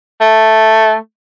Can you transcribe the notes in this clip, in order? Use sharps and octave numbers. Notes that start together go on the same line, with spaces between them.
A3